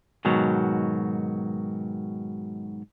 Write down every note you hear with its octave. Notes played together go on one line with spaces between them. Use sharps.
G#2 B2 D#3 F#3